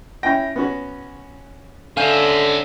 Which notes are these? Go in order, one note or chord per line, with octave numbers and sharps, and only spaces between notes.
C#4 E4 G5 A#6
B3 C#4 F#4
D3 C#4 E5 F5 G#5 G6